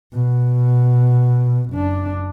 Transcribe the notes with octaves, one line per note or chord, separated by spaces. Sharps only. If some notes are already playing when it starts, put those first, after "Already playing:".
B2
F#1 D4